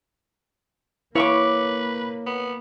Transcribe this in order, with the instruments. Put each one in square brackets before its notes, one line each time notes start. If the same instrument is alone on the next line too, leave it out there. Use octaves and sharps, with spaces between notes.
[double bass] A#3 [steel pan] E4 F5 E6 [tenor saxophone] B4 [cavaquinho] C#5 C#6 D6
[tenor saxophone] B3